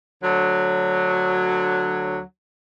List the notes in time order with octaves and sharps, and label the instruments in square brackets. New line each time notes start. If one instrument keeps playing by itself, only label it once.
[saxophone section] D2 D3 F#3